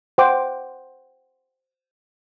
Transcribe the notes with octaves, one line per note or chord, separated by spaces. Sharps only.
C5 F#5 G5 D6